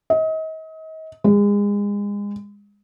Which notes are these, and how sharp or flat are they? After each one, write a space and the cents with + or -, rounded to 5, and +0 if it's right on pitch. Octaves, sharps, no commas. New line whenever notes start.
D#5 +35
G#3 -30